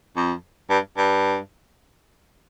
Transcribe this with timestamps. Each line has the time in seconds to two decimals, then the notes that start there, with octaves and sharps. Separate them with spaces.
0.17 F2
0.70 G2
0.97 G2